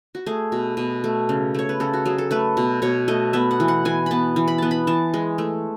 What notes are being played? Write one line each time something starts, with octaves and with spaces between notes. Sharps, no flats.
F#4
A3 G#4
B2
B2
A3
C#3
A3 C#5
B4
C#3 A4
F#4
F#3 G#4
A4
A3 B4
B2
B2 C#5
A3 D#5
B3 E5
F#5
E3
F#5
E3 G#5
B3 A5 B5
E3
B5
B3 A5
B5
E3 A5
G#3
A3